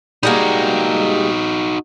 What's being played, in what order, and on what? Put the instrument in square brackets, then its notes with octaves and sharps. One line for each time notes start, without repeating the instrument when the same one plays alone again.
[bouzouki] G3 G#3 A#3 [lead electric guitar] D#4 F#4